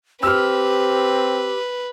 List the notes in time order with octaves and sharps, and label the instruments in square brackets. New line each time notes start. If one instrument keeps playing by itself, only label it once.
[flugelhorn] C4 [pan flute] G4 [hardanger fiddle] B4 [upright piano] E6 F6